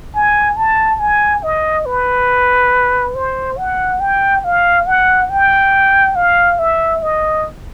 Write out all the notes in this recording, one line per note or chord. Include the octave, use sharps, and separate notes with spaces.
G#5
A5
G#5
D#5
B4
C5
F#5
G5
F5
F#5
G5
F5
E5
D#5